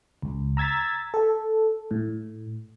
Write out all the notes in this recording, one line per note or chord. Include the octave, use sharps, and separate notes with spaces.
C#2
A#5 E6 G#6 A6 B6
A4
A2